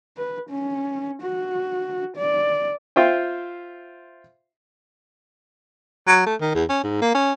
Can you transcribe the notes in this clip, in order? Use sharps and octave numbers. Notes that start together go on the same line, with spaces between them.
B4
C#4
F#4
D5
F4 C5 E5 G5
F#3
A3
D#3
E2
C#4
G#2
A#3
C#4